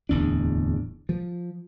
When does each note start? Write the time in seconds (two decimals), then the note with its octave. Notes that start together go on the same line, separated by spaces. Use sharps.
0.09 D1 E2 D4
1.09 F3